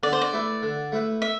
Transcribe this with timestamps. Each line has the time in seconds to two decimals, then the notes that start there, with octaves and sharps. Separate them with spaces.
0.03 D3 D5
0.13 C5
0.21 D5
0.33 A3 E4 B4
0.63 D3
0.92 A3 E4 B4
1.22 E5